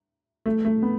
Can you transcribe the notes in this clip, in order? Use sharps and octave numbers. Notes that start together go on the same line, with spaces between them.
A3
A3
B3